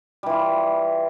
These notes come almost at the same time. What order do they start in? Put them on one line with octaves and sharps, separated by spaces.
G3 E3 F4